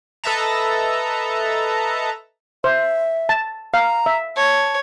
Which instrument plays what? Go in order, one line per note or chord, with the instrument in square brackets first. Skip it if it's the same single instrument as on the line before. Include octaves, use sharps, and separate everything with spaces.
[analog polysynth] A4 B4 D#5 E5 A5 A#5
[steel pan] C5 [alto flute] E5
[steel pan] A5
[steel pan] F5 [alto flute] A#5
[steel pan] E5
[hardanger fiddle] C#5 [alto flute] A5